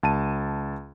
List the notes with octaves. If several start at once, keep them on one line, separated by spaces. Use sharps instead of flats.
C#2 A5 D#7